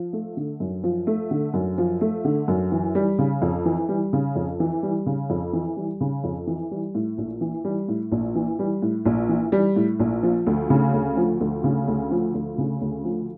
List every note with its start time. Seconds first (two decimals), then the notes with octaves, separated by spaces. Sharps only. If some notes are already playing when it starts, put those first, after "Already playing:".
Already playing: F3
0.13 A3
0.37 D3
0.60 F#2
0.84 F3
1.07 A3
1.31 D3
1.54 F#2
1.78 F3
2.01 A3
2.25 D3
2.48 F#2
2.72 E3
2.95 G3
3.19 C#3
3.42 F2
3.65 E3
3.89 G3
4.13 C#3
4.36 F2
4.60 E3
4.83 G3
5.06 C#3
5.30 F2
5.53 E3
5.77 G3
6.01 C#3
6.24 F2
6.47 E3
6.71 G3
6.94 A2
7.18 A#1
7.41 E3
7.65 G3
7.88 A2
8.12 A#1
8.35 E3
8.59 G3
8.82 A2
9.05 A#1
9.29 E3
9.52 G3
9.76 A2
10.00 A#1
10.23 F3
10.47 D2
10.70 C#3
10.94 D2
11.17 F3
11.40 D2
11.64 C#3
11.88 D2
12.11 F3
12.34 D2
12.58 C#3
12.81 D2
13.05 F3